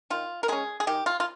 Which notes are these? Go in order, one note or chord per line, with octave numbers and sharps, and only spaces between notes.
D#3 F4
A#4
G#3 C#4 G#4
G#4
D#3 G4
F4
F4